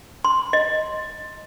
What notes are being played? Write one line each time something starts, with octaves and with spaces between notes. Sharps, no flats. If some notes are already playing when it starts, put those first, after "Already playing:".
C6
D#5